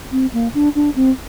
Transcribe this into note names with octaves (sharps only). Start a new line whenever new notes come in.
C4
A#3
D4
D4
C4